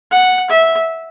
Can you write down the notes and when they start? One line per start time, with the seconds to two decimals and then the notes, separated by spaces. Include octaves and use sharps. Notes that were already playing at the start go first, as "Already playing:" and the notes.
0.12 F#5
0.51 E5